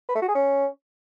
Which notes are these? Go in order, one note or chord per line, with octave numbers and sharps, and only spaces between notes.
B4
A3
F#4
G#4
C#4